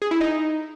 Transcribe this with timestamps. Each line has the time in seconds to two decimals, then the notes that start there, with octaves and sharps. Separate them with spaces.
0.02 G#4
0.11 E4
0.21 D#4